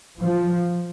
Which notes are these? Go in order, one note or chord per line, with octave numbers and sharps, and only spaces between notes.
F3